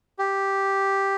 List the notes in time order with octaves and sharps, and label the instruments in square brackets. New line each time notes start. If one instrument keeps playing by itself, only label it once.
[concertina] G4